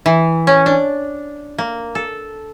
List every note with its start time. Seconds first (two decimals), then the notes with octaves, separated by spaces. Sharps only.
0.06 E3
0.47 C#4
0.66 D4
1.58 A#3
1.95 A4